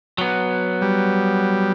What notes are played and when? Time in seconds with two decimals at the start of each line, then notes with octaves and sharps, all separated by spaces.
0.18 F#3 B3
0.82 G3